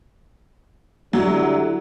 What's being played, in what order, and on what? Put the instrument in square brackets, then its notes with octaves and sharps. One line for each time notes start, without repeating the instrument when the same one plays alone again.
[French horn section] D3 G3 E4 [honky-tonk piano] F#3